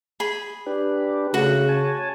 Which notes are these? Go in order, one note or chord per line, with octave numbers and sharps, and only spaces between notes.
G#4 B5
D4 G4 B4
C#3 A3 F#4
C#5 G#5 A5